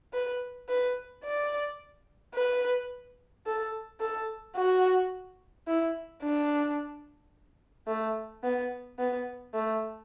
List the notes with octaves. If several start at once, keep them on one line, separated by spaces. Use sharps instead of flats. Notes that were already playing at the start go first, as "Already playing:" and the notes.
B4
B4
D5
B4
A4
A4
F#4
E4
D4
A3
B3
B3
A3